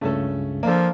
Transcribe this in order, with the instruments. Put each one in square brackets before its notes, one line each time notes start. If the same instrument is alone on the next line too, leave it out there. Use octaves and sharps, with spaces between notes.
[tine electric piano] C#2 G2 C#3 [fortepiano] A3 C#4 A4
[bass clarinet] F3 [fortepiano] A#3 D4 A4